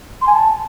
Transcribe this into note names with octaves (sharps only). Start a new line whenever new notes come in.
C6
G#5
A5